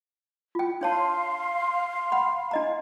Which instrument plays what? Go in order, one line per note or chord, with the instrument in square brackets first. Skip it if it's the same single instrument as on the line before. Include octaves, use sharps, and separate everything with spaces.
[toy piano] F4 G5
[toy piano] D4 C#5 A5 [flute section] F5 C6
[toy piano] F#5 B5
D4 D#5 A#5